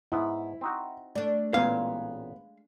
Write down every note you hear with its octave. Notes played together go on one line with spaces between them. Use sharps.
G#2 B3 E4
C4 D#4 F#4
A3 D4 D5
A1 A#2 G#3 B3 F5